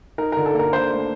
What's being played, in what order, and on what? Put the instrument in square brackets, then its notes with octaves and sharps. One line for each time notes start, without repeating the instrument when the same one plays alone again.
[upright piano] D#4 A#4
D3 A#4
A4
A#3
A#4
D4 C5
A3